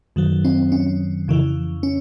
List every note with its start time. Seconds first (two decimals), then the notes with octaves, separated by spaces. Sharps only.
0.16 F#2 D#3 F#3
0.45 C4
0.72 C#4
1.28 F2 C#3 E3
1.83 C#4